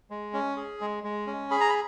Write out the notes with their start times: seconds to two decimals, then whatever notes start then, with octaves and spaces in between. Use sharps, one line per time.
0.10 G#3
0.34 C#4
0.57 G#4
0.81 G#3
1.04 G#3
1.27 C#4
1.51 G#4 B5
1.61 A#5
1.69 B5